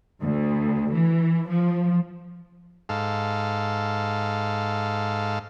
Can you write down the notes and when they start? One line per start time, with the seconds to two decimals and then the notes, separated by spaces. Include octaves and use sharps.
0.22 D2
0.92 E3
1.49 F3
2.89 G#2 A4 F5